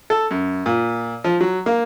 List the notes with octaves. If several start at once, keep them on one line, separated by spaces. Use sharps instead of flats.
A4
F#2
A#2
F3
F#3
A#3